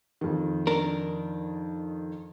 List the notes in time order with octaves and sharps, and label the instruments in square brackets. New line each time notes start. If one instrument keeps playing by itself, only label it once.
[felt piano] F2 D#3
[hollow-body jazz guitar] D4 A#4